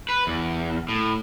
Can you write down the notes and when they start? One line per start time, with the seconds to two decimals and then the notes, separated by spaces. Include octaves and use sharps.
0.09 B4
0.27 E2
0.89 A2